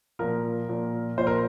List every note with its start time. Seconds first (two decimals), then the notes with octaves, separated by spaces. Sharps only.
0.19 A#2 F3 A#4
0.69 A#2 F3
1.18 A#2 F3 C5
1.27 A#4